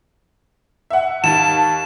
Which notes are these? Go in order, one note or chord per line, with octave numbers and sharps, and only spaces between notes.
E5 F#5
D#2 A5 E7